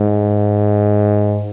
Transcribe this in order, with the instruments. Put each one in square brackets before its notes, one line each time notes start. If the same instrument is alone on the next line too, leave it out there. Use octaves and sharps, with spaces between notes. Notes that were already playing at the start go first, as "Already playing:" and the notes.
Already playing: [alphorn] G#2